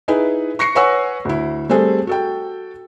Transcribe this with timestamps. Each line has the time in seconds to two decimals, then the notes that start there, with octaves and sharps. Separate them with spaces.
0.08 D#4 E4 G#4 B4
0.59 C#6 A#6 C7 C#7
0.75 B4 C#5 F#5 G#5 C#6 E6
1.25 D2 E4
1.69 G3 A3 C4 G#4 A4
2.07 F#4 A4 G5